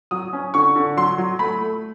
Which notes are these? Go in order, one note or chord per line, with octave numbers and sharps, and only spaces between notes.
F#3 D#6
C#4
D3 C#6
D3
F#3 C6
F#3
A3 B5
A3